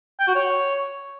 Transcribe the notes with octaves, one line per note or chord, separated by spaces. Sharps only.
G5
F#4
C#5